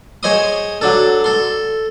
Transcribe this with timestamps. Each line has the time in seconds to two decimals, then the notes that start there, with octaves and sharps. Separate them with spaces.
0.23 G#4 C5 C#5 D#5 C6 D#6
0.81 F#3 D4 A4
1.24 A4 C6